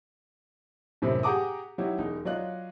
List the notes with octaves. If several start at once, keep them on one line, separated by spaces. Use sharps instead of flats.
F#2 A2 C3 D#3 D#4
G4 G#4 F#5 A#5 D6 D#6
F#3 D#4 E4 F#4 G4
E1 D#4
F#3 F4 D5 D#5 F#6